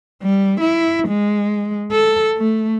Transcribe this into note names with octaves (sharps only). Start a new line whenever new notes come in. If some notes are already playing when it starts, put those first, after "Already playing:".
G3
E4
G#3
A4
A3